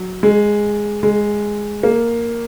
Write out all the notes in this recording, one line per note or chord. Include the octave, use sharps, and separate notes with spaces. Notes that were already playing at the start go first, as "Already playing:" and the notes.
Already playing: F#3
G#3
G#3
A#3